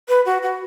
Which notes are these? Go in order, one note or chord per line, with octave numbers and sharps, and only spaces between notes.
B4
F#4
F#4